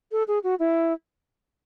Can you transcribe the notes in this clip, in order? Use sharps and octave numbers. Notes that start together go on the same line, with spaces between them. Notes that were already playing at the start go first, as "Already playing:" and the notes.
A4
G#4
F#4
E4